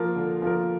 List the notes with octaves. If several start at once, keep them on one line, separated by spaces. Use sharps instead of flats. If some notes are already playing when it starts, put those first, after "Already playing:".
Already playing: F3 A#3 F4 A#4
D3
F3 A#3 F4 A#4